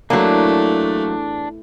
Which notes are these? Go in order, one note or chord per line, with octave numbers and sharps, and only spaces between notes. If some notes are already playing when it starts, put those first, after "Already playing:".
E2 F#3 A3 A#3 D4